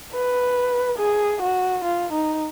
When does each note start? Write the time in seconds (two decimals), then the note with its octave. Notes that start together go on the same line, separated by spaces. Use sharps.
0.13 B4
0.98 G#4
1.42 F#4
1.84 F4
2.12 D#4